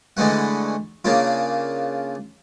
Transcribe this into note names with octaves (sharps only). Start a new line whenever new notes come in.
D3 E3 G#3 A3 F#5
C#3 A#3 D4 F4